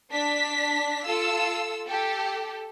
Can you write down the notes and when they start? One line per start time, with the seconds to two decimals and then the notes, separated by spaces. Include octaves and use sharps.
0.12 D4 B6
1.05 F4 A4 E6
1.86 G4 A4